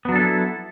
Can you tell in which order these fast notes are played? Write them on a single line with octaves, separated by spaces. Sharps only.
B3 F#3 D4 A4 E4